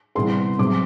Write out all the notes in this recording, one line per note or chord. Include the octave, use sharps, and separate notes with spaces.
C3 E3 G3 B3 C6
C3 F#3 C4 D6